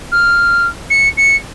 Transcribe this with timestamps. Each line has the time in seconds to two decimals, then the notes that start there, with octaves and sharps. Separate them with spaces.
0.11 F6
0.90 C#7
1.17 C#7